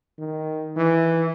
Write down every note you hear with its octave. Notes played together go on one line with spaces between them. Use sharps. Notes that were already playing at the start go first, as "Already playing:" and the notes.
D#3
E3